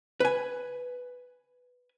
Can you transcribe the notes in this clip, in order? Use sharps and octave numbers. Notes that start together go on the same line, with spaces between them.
B4 G#5